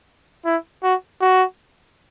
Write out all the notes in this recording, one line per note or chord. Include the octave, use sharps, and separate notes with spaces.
E4
F#4
F#4